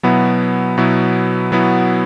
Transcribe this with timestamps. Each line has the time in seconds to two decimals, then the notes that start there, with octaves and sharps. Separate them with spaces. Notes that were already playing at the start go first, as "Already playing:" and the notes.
0.03 B2 F#3 B3 E4
0.78 B2 F#3 B3 E4
1.52 B2 F#3 B3 E4